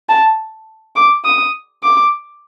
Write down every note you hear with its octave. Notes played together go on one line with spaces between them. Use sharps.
A5
D6
D#6
D6